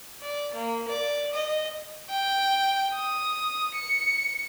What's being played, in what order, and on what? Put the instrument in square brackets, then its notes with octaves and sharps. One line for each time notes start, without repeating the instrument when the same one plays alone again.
[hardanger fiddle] D5
A#3
D5
D#5
[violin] G5
D#6
C#7